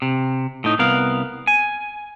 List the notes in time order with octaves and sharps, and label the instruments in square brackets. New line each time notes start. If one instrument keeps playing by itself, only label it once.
[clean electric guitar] C3
A2 D#4
C2 B3 A#4 F5
G#5